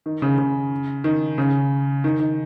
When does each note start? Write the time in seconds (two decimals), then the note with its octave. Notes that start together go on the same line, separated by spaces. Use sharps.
0.06 D#3
0.22 C#3
0.38 C#3
1.04 D#3
1.38 C#3
2.04 D#3
2.20 D#3